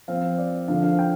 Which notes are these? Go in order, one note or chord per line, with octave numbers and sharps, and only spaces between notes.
F3 C4 F5
D5
D3 F3 D4 F5
F5
G5